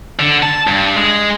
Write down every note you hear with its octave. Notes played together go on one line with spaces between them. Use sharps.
D3
A5
G2
G#3